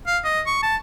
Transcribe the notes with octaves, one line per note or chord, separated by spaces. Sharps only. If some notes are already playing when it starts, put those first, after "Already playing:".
F5
D#5
C#6
A5